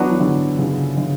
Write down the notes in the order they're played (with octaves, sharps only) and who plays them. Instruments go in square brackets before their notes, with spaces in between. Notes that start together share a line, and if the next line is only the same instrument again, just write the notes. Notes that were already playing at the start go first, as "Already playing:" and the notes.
Already playing: [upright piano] E3 [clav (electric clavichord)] F#3 B3 D4 F#4
[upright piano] E3
D3
C#3
D3